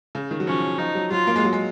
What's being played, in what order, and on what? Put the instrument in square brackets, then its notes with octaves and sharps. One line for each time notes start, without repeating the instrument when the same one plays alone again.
[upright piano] C#3
D#3
F#3
[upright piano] F3 [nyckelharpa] C#4
[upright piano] F3 [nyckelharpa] D#4
[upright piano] F#3
[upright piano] F#3 [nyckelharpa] F4
[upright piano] A#3
G#3
F#3
G#3